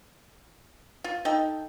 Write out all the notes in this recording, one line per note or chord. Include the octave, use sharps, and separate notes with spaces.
F4
D#4 A4 G5